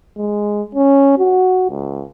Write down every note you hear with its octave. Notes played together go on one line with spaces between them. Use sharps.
G#3
C#4
F#4
C#2